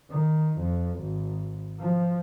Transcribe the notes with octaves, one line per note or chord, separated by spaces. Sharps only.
D#3
F2
G#1
F3